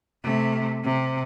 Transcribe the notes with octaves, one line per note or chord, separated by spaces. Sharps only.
C3 A3
C3